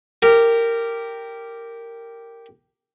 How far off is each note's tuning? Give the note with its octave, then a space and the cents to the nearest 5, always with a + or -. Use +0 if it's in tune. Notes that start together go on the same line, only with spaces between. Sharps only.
G4 +0 A#4 -15